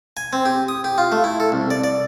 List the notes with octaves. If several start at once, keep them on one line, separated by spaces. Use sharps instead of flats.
G#5
C4
G4
D#6
G4
F4
A3
E4
A4
C2
D5
D5